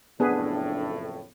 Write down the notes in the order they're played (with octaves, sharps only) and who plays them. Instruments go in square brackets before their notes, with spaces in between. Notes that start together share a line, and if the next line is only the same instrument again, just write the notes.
[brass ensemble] F#1 F2 A2 [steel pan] B3 G#4 B4 [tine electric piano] D4